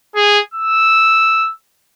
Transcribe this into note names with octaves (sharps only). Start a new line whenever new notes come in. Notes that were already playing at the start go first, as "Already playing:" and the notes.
G#4
E6